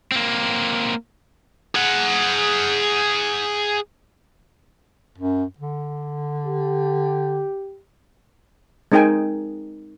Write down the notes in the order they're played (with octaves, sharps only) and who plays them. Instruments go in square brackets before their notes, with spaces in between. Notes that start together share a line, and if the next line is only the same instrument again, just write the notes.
[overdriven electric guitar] A#3 C4
[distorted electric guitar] G#4 F#5
[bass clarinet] F#2
D3
[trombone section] G4
[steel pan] G#3 C4 D#4 A#4 G5 G#5